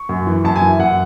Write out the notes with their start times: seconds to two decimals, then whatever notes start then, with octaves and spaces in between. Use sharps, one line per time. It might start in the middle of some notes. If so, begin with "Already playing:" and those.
Already playing: C#6
0.09 F#2
0.27 E3
0.44 F#2 A5
0.56 G#5
0.62 E3
0.68 E5
0.79 F#2 F#5